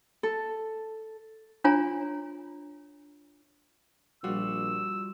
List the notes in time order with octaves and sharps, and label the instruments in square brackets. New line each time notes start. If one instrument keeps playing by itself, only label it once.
[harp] A4
[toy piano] D4 F4 C#5 G#5 A#5
[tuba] A#1 [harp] G3 F4 F#4 [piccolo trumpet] E6